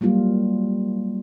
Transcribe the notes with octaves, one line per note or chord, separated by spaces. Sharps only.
F#3 G3 A#3 F4